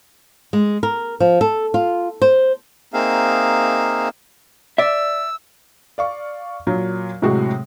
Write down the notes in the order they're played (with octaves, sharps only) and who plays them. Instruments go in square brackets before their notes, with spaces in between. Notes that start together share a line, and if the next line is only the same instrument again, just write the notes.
[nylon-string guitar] G#3
A#4
F3
A4
F4
C5
[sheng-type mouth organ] A#3 C4 D#4 G#4 E5 F5
[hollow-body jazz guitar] D5 E5 [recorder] E6
[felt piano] D5 F5 C#6
A#2 F#3
A2 C3 F#3 G#3 F#4